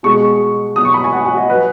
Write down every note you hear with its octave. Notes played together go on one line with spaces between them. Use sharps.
B2 G#3 C#6
B2 F#3 D#6
C#6
B5
G#5
F#5
F#5
D#5
F#3 B4